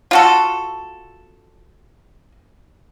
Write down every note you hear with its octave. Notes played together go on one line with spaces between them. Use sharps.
F4 F#4 A4